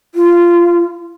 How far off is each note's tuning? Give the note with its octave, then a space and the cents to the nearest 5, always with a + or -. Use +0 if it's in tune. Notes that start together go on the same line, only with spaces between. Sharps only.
F4 -15